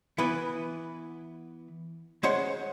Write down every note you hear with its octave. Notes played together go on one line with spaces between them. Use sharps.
E3 B3 E4 B4
G#3 C#4 C5 C#5 F#5 C6